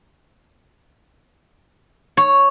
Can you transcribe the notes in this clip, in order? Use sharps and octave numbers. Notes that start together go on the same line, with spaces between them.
C#5